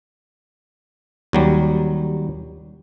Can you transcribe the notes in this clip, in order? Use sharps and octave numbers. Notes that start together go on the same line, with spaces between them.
D#2 F#3 G3